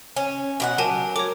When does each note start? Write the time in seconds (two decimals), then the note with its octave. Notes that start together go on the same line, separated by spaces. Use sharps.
0.17 C#4
0.60 B2 F#4 F#5
0.78 F#3 G4 A#4 G#5 A5
1.16 A#4 C#5 D6